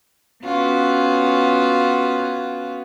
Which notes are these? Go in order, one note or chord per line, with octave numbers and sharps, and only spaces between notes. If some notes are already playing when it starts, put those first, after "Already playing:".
B3 C#4 F4 F#4